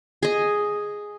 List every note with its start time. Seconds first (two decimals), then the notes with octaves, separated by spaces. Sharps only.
0.23 G#4 D#5